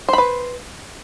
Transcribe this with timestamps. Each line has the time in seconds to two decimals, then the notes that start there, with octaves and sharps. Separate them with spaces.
0.08 C5
0.13 B5
0.18 B4